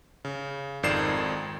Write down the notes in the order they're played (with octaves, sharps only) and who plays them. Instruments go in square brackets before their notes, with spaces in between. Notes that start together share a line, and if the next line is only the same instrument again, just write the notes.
[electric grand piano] C#3
G#1 F2 D#3 D5 C7 E7